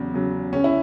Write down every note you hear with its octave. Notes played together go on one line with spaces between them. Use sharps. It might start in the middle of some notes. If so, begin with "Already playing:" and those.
Already playing: E2 C#3 F#3
C#3 F#3
C#2 C#4
E4